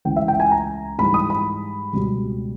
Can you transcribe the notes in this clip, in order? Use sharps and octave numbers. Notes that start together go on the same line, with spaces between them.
C#2 C#3 E3 G5
E5
G5
G#5
A#5
G#2 E3 G3 B5
D#6
B5
C#2 B2 G3